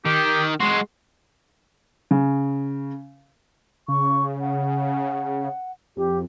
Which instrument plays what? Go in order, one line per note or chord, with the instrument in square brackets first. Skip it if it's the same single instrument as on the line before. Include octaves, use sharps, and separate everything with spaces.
[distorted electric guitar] D#3 [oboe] G4
[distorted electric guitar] G#3 F#4 [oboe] C6
[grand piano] C#3
[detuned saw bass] C#3 [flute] C#6
[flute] F#5
[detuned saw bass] F2 [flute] G4